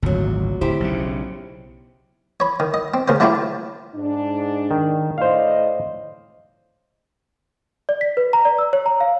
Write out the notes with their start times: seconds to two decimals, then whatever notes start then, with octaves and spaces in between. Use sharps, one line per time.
0.03 G#1 D2 A#2 F#3
0.61 D1 E4 G4 C5
0.80 B1 C#3
2.40 C#5 B5
2.60 D#3
2.74 D#5
2.94 C4
3.08 D2 C#3 A#4 C5
3.20 F#3 A3 D4 E4 F4 G4
3.95 G#2 D4
4.71 D#3
5.18 A2 C5 D5 D#5 F5
7.89 D5
8.01 B6
8.17 B4
8.33 A#5
8.45 D5
8.58 E6
8.73 C#5
8.86 A#5
9.00 F5